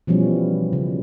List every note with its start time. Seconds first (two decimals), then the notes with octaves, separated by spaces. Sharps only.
0.07 B2 E3 F3 G3 C#4
0.73 C#3